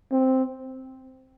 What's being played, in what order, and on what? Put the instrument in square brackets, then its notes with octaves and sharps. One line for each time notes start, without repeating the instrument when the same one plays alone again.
[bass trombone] C4